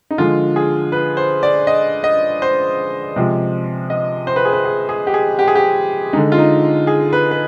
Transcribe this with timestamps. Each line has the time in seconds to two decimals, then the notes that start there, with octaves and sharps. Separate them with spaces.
0.11 D#4
0.18 D3 F3 G#3 F4
0.56 G#4
0.92 B4
1.17 C5
1.43 D5
1.67 D#5
2.04 D#5
2.42 C5
3.16 C3 F3 G#3
3.90 D#5
4.27 C5
4.36 B4
4.45 G#4
4.53 B4
4.65 G#4
4.89 G#4
5.07 G4
5.14 G#4
5.39 G4
5.48 G#4
5.55 G4
6.13 D3 G#3 D#4
6.32 F4
6.38 D#4
6.87 G#4
7.13 B4
7.31 B4